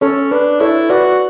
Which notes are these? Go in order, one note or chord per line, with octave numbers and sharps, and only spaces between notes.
C#4 A4 C#5
D4 B4
E4 A4 C#5
F#4 B4 D5